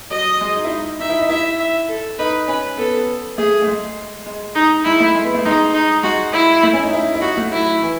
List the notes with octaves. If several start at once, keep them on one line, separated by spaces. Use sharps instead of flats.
F#3 D#5
G#3
D#4
E4
D#4
D#4 E5
E4
D#4
E4 E5
E5
A4
D#4 B4
C#4 B4
B3 A4
A3 G#4
A3
G#3
G#3
D#4
G#3 E4
A3
G#3
B3
A3
G#3 D#4
D#4
G#3 F#4
E4
A3
C#4
D#4
E4
E4
D#4 F#4
A3
F#3 E4
E3